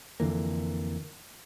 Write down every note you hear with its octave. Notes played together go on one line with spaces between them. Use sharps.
F2 D3 E3 A#3